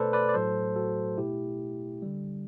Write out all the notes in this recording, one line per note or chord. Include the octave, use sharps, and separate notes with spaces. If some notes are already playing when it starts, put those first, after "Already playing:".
Already playing: B2 A3 A4 B4 C5 D5
B4 D5
D5
A2 F#3 A3 A4 C5
F#4 A4
B2 A3 E4 G4
D3 G3